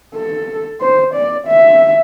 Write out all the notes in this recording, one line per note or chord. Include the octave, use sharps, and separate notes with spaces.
A4
C5
D5
E5